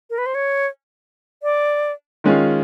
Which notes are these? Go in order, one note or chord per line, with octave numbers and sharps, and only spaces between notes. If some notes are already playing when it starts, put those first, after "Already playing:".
A#4
B4
C5
C#5
D5
D#3 G#3 C#4 F4